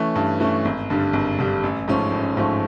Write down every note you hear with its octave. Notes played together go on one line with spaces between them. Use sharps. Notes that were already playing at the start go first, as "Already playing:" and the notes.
Already playing: E3 A3 C#4
G2
E3 A3 C#4
G#1
G2 D3 G3
G#1
G2 D3 G3
A1
G#2 F3 A3 C#4
A1
G#2 F3 A3 C#4